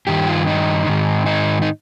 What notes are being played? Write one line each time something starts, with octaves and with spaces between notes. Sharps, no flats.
G2 D#3 G4
F4
D#4
G#2 D#3
D#4
D#4